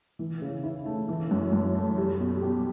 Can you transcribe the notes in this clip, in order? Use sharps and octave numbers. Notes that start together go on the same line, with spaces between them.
E3
C#3
E4
A3
E3
F#2
F#2
A3
G3
B2
G4